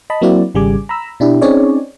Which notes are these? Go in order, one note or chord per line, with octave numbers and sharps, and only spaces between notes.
D#5 A5 B5
F#3 A#3 C4 E4 F#4 D5
G#1 C#3 G3 G#4 G#5 D6
A#5 B5 E6
B2 D4 E4 G4
C4 C#4 D#4 G#4 C#5 D5